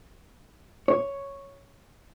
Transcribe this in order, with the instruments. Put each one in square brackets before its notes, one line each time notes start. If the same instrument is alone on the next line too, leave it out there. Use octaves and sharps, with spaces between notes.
[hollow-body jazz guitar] C#5